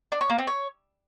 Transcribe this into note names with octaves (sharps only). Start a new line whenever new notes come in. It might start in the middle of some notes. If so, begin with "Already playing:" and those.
D4
C#5
A#3
C4
C#5